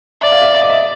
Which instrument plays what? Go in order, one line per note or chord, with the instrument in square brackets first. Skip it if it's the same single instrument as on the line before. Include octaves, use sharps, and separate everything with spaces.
[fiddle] D5 [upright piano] E5
[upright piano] F5
E5
[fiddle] D5 [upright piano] E5
[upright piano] D#5
E5